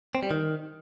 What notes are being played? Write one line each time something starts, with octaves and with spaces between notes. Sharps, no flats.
C4
G3
D#3